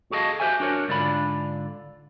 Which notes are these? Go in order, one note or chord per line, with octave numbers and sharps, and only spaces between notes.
F#4 G#4 A4 D#5 F5
F#4 G4 A#4 C5 E5 G#5
D4 F#4 A#4 C#5
G#2 D3 D4 F4 B5